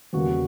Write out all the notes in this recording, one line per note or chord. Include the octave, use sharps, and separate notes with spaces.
E2 C#3 G3 A#3 F#4